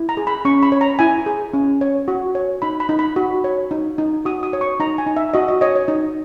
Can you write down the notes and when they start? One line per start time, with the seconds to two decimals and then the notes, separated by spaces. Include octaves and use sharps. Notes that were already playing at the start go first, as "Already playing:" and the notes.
Already playing: E4
0.09 A#5
0.17 G#4
0.27 B5
0.45 C#4 C#6
0.63 B5
0.72 C#5
0.81 A#5
0.99 E4 G#5
1.26 G#4
1.54 C#4
1.81 C#5
2.08 F#4
2.35 C#5
2.62 D#4 B5
2.80 B5
2.89 D#4
2.99 B5
3.16 F#4
3.44 C#5
3.71 D#4
3.98 D#4
4.25 F#4 D#6
4.43 D#6
4.53 C#5
4.61 C#6
4.80 D#4 A#5
4.98 G#5
5.07 D#4
5.16 E5
5.34 F#4 D#5
5.48 D#5
5.61 C#5 D#5
5.76 C#5
5.88 D#4